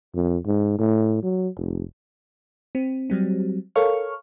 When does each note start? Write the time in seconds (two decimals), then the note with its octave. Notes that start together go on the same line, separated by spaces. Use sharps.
0.15 F2
0.46 G#2
0.79 A2
1.23 F#3
1.57 F1
2.75 C4
3.10 F#3 G3 C4
3.76 A4 A#4 C#5 F5 C#6 F6